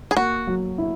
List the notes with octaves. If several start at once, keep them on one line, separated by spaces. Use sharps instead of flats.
G#4
A#3 F#4
F#3
E4